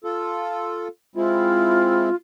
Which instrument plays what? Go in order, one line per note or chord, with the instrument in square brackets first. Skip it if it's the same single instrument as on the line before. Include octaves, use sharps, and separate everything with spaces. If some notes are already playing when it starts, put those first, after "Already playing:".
[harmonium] F4 A4
[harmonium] G#3 C4 E4 [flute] F4